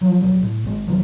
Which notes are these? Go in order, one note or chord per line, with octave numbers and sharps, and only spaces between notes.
F3 F#3
D#1 F#2 F#3 G3
A2
G#1 G#3
F#2 D#3 E3 F#3